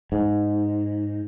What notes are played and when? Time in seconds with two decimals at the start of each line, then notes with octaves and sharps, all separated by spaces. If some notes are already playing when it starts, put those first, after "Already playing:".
0.12 G#2